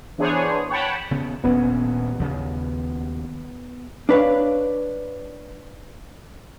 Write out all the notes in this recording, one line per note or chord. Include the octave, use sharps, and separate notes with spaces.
E3 B3 D4 G#4 C5 C#5
C#5 F#5 G5 A5 B5
C#3 B3
D#1 A#1 B3 C#4
D#2 C#3
D4 B4 C#5 F5